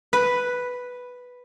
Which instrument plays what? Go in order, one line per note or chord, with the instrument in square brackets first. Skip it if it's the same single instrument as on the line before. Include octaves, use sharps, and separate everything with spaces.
[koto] B4